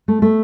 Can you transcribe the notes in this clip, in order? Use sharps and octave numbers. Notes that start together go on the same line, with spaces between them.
A3
A3